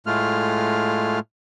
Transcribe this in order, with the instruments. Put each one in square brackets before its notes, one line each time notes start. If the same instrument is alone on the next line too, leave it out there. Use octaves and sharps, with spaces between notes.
[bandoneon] A2 G#3 A3 F4 F6